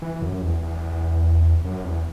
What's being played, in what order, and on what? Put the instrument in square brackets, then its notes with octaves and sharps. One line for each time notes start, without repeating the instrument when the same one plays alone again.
[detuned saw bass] E3
F#2
E2
E2
F#2
E2